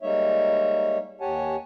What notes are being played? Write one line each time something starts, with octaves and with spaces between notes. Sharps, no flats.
G3 G#3 A#3 D#4 C#5 E5
D#2 G4 C#5 F#5 G#5 A5